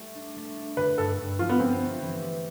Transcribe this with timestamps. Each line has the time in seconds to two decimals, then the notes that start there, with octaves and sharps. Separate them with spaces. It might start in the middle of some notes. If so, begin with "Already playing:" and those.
Already playing: G3 A3 E4
0.15 D4
0.36 A3
0.57 D4
0.77 D3 B4
0.98 G2 A4
1.18 G2
1.39 F3 F4
1.49 B3
1.60 C4 G4
1.81 A3
2.02 E3
2.22 G4